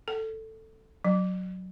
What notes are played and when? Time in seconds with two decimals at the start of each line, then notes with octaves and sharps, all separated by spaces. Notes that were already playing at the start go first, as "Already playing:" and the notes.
0.08 A4
1.04 F#3